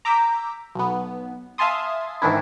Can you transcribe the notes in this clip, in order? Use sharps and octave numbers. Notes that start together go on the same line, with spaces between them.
A#5 D6 E6 G6 B6
B1 B3
E5 F5 G#5 A5 C6 D#6
G#2 D#3 E3 D4 E4